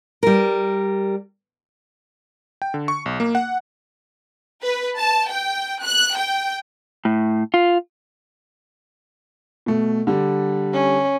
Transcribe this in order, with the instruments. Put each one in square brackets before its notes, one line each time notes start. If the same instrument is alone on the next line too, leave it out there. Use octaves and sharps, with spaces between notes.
[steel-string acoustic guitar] G3 A#4
[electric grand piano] G5
D3
C#6
B1
A#3
F#5
[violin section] B4
A5
G5
F#6
G5
[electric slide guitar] A2
F4
[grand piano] B2 A3
D3 G3
[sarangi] C#4